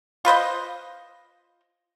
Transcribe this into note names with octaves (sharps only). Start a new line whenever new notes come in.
F4 B4 C5 D#5